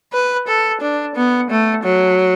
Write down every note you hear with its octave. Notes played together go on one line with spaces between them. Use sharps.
B4
A4
D4
B3
A3
F#3